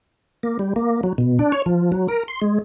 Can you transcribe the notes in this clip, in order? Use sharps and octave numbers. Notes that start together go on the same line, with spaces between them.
A#3
G3
A#3
F#3
B2
D4
C#5
F3
F#3
A#4
C6
G#3